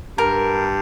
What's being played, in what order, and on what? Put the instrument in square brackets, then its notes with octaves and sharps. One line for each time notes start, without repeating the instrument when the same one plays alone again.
[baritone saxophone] G2 [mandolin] A#4